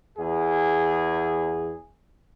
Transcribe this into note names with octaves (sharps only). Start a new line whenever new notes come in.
E2 G#4